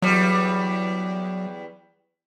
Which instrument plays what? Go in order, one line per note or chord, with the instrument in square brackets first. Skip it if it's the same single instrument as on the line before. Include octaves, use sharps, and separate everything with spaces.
[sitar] E2 G3 [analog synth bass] F#3